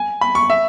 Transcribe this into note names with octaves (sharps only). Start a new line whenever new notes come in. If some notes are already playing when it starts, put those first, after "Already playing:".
Already playing: G#5
B5
C#6
E5